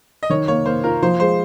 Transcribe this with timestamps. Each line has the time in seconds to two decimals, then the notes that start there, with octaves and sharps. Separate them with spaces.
0.23 D#5
0.30 D#3 C#5
0.48 A#3 C#5
0.66 A#3 C5
0.84 F4 A#4
1.03 F3 C5
1.20 G#3 C5